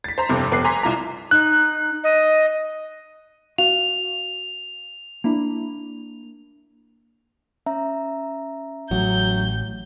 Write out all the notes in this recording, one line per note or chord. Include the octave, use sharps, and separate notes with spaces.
A6 B6
C5 A#5
F1 G2 C3
F1 B3 D6 F#6 C7
G#5 A#5 C6 D6 B6
C2 F4 A#5 D6
D#4 F#6
D#5
F#4 F5 F7
A#3 D4 E4
C#4 E5 A#5
A1 F#3 G6